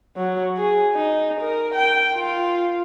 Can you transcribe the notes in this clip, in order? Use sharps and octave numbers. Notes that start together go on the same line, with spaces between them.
F#3
G#4
D#4
A#4
G5
F4